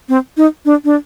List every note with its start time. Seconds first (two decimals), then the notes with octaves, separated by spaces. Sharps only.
0.09 C4
0.37 D#4
0.65 D4
0.85 D4